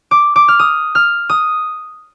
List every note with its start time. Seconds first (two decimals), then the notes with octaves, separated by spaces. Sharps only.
0.11 D6
0.36 D6
0.48 F6
0.59 D#6
0.95 F6
1.29 D#6